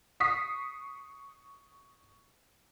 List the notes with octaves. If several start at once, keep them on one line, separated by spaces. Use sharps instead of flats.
C#6 D#6 B6 C7